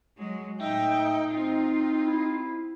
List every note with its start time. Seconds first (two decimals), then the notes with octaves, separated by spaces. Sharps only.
0.17 F#3 G#3
0.61 A2 D#4 E5 G5
1.30 C4 F4
2.06 E4